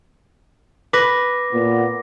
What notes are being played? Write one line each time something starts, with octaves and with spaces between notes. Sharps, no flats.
B4 D6 A#6
A#2 B3